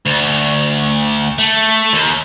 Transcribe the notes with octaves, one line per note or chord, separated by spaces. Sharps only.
D2
A3
D#2